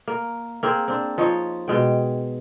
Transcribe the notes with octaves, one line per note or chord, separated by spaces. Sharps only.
A#3
A#3 C4 G#4
C4 D4
F3 D#4 C#5 D#5
B2 G#3 G5